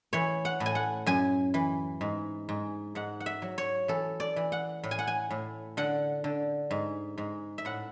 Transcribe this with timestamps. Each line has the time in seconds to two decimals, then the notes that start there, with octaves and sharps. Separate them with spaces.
0.13 E3 C#5
0.45 F#5
0.60 A2
0.66 G#5
0.75 F#5
1.06 F#2 G#5
1.54 E3
2.01 G#2
2.49 G#2
2.95 G#2 F#5
3.20 F#5
3.26 E5
3.42 F#3
3.58 C#5
3.88 E3 A4
4.20 D5
4.36 E3
4.52 F#5
4.83 A2
4.91 G#5
4.99 F#5
5.07 G#5
5.30 A2
5.77 D3 F#5
6.24 D3
6.71 G#2
7.18 G#2
7.58 E5
7.65 A2 F#5